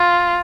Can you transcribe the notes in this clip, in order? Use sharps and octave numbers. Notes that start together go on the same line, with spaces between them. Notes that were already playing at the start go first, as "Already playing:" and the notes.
Already playing: F4